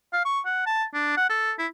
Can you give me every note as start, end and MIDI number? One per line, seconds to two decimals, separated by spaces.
0.13 0.21 77
0.25 0.40 85
0.45 0.62 78
0.66 0.84 81
0.94 1.13 62
1.17 1.27 78
1.29 1.52 69
1.59 1.67 64